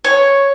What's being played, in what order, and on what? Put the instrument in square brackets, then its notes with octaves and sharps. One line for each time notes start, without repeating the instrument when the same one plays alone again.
[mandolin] C#5